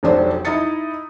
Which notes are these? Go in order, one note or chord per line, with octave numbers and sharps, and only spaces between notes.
F1 B1 F#3 D4 C5
D#4 E4 D#5 D#6 A6 C#7